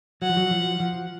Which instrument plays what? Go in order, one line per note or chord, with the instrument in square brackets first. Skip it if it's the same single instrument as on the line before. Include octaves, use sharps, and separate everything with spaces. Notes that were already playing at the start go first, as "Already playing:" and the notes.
[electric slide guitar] F#3 [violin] F#5
[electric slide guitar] F3
F#3
F3
F3